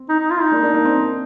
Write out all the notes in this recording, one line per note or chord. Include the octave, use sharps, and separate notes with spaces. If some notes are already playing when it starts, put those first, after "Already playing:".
Already playing: C4
D#4
D#4
F4
D#4
A#3 D4
A#3 D4
A#3 D4
C4
C4